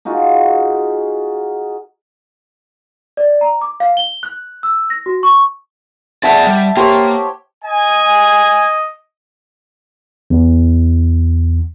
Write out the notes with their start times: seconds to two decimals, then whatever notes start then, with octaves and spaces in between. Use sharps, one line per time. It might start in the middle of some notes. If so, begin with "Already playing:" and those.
0.05 D#4 F4 F#4 G#4
3.17 D5
3.41 A#5
3.62 D6
3.80 F5
3.97 G7
4.23 F#6
4.63 E6
4.90 A#6
5.06 F#4
5.23 C#6
6.23 G#4 D5 E5 F#5 A5
6.47 G3
6.77 A#3 G4 C5 C#5
7.64 D#5 G#5
10.30 E2